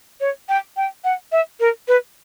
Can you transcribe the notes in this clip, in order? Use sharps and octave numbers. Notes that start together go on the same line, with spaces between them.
C#5
G5
G5
F#5
E5
A#4
B4